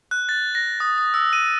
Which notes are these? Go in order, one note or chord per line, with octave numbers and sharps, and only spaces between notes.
F#6
A6
A#6
D#6
D#6
E6
D#7